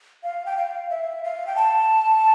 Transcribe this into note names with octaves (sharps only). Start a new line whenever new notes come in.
F5
G5
F5
E5
F5
G5
A5